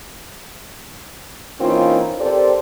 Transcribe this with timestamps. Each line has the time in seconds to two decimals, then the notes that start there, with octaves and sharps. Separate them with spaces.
1.60 E3 A#3 C4 C#4 D#4 F4
2.21 C4 G4 A4 A#4 C5 D5